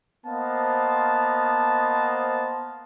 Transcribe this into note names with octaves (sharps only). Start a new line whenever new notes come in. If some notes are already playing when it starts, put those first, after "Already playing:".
A#3 B3 C5 D#5 F5 A5